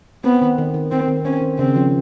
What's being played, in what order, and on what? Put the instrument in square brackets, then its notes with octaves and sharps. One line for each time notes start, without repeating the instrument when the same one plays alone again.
[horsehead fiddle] B3 [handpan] C4
[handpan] D#3
D#3
D#3
[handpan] D#3 [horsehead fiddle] C4
[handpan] D#3
[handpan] C4 [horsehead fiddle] C#4
[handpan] D#3
[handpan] C#3 [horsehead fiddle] C4
[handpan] F3